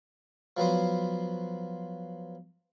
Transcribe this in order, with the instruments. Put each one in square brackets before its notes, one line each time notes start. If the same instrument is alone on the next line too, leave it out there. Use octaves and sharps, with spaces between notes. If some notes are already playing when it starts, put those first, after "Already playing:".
[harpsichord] F3 F#3 B3 C5